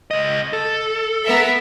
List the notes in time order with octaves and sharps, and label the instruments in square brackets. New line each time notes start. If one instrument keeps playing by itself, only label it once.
[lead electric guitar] C#2 D#5
A4
[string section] B3 A#4 E5